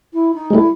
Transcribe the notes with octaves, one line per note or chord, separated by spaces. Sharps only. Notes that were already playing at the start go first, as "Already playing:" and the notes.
E4
D#4
G#3
G3 A3 E4